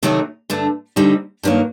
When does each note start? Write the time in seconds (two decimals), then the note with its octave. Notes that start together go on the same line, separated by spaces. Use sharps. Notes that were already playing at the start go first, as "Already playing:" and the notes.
0.03 C3 D#3 F#3 A3 D#4
0.50 G2 D3 A3
0.96 D2 D3 G3 C4 D#4
1.43 G2 D#3 F#3 A#3